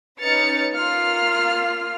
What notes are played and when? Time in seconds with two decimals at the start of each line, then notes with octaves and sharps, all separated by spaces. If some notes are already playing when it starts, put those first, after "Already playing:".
0.20 C#4 D#4 B4 F6 A6 C#7
0.75 A#3 F4 F6 C7